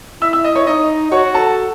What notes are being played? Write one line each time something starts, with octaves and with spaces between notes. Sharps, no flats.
E4 E5 E6
E5 E6
D#5 D#6
C#5 C#6
D#4 D#5 D#6
F#4 C#5 C#6
A4 A5